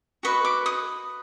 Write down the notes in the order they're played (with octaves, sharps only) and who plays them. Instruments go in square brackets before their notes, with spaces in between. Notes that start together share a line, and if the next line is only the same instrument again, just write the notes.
[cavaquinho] F#4 B4 D#5 C#6
D6
D#6